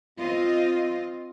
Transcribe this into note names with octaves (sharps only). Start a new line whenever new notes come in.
C4 F4 D#5